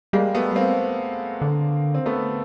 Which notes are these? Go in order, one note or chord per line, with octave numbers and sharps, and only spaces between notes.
G3 G#3 A#3
A3 B3
A#3 C4
D3
C4
A3 B3